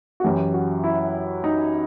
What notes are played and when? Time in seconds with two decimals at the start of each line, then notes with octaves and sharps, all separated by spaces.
0.20 F#4
0.24 F#2 E3 G4
0.54 F#4
0.84 E4
1.44 D#4